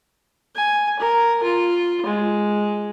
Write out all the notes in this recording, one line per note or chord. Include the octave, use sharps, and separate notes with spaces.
G#5
A#4
F4
G#3